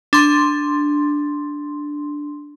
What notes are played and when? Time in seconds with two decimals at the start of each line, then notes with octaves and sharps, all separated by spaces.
0.13 D4 C6